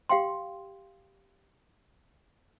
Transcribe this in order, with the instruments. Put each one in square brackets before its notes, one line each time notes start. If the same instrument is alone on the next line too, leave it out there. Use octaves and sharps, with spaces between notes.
[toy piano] G4 F5 G5 C6